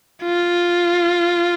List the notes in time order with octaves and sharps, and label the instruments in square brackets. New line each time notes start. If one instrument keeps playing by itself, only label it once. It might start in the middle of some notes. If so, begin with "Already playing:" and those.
[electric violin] F4